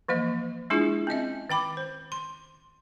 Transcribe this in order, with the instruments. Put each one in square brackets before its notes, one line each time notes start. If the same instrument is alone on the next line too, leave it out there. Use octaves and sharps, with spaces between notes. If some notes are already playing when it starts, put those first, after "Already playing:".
[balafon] E3 F3 A#3 D#5
G#3 D4 E4 F4 G#4
C4 C#4 D#5 E5
D#3 G5 B5 D6
C5
C6